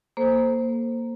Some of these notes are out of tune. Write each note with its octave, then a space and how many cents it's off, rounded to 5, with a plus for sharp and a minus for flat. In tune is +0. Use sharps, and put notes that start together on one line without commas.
A#3 +0 A4 +0 C5 +0